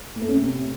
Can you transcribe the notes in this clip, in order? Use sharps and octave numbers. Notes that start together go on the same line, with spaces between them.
A2
A3
C#4
C3